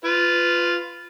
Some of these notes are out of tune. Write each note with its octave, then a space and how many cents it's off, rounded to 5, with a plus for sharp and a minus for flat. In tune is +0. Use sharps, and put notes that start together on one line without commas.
F4 +0 B4 +20